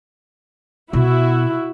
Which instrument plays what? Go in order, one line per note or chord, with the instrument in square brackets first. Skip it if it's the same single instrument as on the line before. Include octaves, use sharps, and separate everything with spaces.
[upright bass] B2 [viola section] E4 F#4